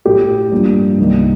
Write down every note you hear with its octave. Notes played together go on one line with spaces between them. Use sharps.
A2 A3 G4
G2 F3 A#3
C2 C3 D#3 A#3